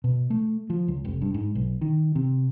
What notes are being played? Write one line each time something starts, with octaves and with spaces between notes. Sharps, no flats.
B2
A3
F3
C#2
F1
G2
G#2
B1
D#3
C3